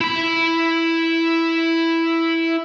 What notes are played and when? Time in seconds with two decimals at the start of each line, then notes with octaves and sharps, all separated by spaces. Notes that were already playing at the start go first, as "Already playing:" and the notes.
0.01 E4 B5